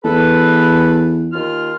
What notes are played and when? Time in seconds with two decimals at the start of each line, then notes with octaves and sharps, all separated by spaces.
0.04 E2 A4 B4
1.33 D#2 F4 F6